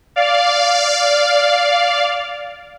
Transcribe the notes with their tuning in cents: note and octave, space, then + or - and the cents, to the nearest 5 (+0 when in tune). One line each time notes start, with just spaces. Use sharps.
D5 -10 F5 +0